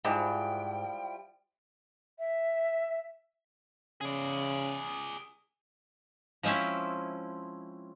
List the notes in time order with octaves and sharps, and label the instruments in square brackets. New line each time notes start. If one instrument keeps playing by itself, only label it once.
[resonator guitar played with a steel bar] G#2 [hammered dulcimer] F3 G3 E4 [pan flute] G5
[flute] E5
[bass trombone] C#3 [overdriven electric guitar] G#4 D5
[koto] F3 G#3 C4 C#4 E4